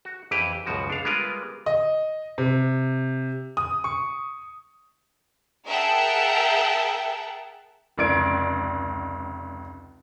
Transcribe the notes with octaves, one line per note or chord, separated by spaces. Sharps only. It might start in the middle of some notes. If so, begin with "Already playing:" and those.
F#4
F2 E3 E4 G4 B4
C#2 F#2 B2 F3 F#4
D4 F5
G3 G#3 B3 F4 A#4 B4
D#5
C3
D#6
C#6
G#4 A#4 E5 F#5 G5 A5
F1 C#2 D5 G#6 D7